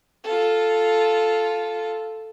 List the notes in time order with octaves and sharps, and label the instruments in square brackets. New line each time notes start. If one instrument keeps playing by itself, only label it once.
[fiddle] F4 A4